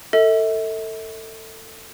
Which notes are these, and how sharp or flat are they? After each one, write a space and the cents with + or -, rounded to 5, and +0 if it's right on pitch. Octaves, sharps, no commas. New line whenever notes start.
A4 +25 E5 -40